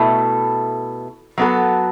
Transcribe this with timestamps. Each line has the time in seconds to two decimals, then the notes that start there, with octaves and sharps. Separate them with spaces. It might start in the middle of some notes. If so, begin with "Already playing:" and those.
Already playing: B2 A3 E4 A4
1.38 F#3 B3 F#4 A4